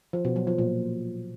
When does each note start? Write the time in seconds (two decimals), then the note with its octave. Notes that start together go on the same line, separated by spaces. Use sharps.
0.13 F3
0.25 B2
0.36 F#3
0.47 F3
0.58 A#2